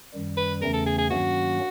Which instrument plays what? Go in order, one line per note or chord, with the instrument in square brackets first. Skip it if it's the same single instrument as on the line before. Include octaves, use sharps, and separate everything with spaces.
[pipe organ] F#2 D#3 G3
[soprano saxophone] B4
[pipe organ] E2 C#3 E3 A3 C#4 [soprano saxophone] A#4
[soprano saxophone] A4
G#4
G#4
[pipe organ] G2 D#3 F#3 A#3 C#4 [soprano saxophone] F#4